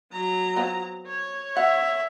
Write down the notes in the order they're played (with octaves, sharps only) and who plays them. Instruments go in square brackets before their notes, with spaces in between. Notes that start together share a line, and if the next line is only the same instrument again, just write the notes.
[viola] F#3 A#5
[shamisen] B3 C4 F4
[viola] C#5
[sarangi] E5 [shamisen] F#5